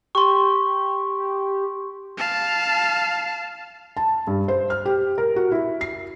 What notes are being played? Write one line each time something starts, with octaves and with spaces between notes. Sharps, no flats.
G4 C6 C#6
F5 A5
A5
G2
C5
F6
G4
A#4
F#4
E4
C7